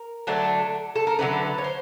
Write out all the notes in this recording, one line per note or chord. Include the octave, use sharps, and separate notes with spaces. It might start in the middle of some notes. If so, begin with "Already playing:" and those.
Already playing: A#4
D3 F#3 A3 D4
A4
A#4
D3 F#3 A3 D4 B4
C#5
C5